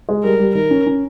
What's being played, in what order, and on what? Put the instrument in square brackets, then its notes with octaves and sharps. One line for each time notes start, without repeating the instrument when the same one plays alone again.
[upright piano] G#3
[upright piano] G3 [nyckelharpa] A#4
[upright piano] G3
[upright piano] D#3 [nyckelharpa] A#4
[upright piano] C#4
C#4